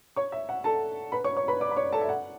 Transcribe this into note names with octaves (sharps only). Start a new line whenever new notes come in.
C#5 C#6
E5
F#5
A4 A5
B4 B5
C#5 C#6
C#5 C#6
B4 B5
D5 D6
B5
C#5 C#6
A4 A5
E5
F#5